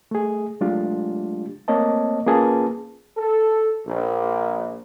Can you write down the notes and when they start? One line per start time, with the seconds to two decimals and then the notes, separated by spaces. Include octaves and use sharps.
0.11 A3 G#4
0.61 F#3 G#3 A3 D4 F4 G4
1.68 A3 A#3 C4 C#5 D#5 A5
2.27 A#3 C#4 F4 G#4 B4 A5
3.17 A4
3.86 A#1